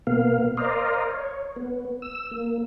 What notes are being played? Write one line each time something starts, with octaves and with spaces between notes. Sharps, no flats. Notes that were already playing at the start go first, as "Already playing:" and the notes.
B2 A#3 B3 F5
A#4 C5 D5 D#5 F5
C#5
B3
E6
A#3